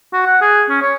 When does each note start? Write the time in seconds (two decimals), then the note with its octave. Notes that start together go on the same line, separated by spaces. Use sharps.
0.13 F#4
0.26 F#5
0.41 G#4
0.69 C#4
0.82 C#5